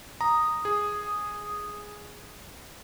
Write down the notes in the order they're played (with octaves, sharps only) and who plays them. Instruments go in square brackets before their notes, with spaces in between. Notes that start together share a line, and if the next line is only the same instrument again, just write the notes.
[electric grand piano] A#5 [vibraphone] D#6
[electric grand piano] G#4